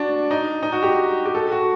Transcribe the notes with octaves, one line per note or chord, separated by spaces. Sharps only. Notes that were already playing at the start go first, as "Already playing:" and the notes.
Already playing: D4 F#4
D#4
D#4
F#4
G4
G4
A4
F#4